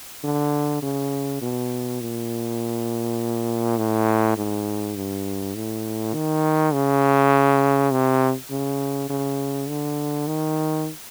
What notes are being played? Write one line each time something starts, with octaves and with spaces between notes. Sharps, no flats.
D3
C#3
B2
A#2
A2
G#2
G2
A2
D#3
C#3
C3
C#3
C#3
D3
D#3